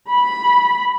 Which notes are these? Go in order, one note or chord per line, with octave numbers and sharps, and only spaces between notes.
B5